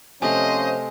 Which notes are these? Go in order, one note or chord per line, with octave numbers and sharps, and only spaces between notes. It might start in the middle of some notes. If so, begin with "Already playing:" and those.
C3 F3 A3 C#4 C5 D#5 G#5 C6